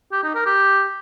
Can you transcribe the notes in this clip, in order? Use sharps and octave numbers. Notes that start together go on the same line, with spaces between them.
G4
D#4
A#4
G4